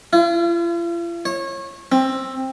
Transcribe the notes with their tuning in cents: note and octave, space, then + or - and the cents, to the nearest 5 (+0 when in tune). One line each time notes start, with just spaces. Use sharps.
F4 -45
C#5 -30
C4 +15